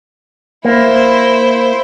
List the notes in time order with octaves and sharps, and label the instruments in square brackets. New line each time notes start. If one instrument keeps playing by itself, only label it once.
[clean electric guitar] A#3 [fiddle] E4 C5